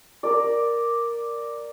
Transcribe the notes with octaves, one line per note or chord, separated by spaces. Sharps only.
A#4 D5